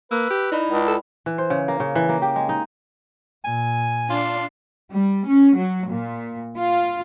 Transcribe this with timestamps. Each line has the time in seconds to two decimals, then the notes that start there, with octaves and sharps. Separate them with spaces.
0.11 A#3 B4 E6
0.30 G4
0.52 D#4 E4 D5 B5
0.70 C#2
0.88 A4
1.26 E3
1.38 C5
1.50 C#3
1.68 A#3
1.80 C#3
1.96 E3
2.09 A#3
2.22 G4
2.36 G#3
2.49 D#4
3.45 A#2 G#5
4.10 D4 F4 C7
4.91 G3
5.27 C#4
5.56 F#3
5.88 A#2
6.58 F4